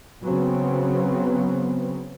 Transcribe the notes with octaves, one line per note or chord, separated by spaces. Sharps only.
C#3 F#3 B3 C4